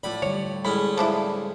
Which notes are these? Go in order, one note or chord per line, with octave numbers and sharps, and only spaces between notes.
A2 F4 D5 B5
D3 G3 C#5
A2 G#3 C#4 B5
F3 D4 E4